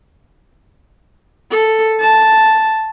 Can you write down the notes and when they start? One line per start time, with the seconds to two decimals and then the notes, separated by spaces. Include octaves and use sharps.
1.51 A4
2.01 A5